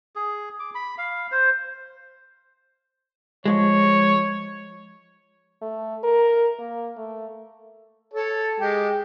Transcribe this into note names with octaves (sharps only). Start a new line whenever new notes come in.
G#4
D6
B5
F5
C5
F3 G#3 C#5
A3
A#4
A#3
A3
A4 C#5 A5
G#3 G4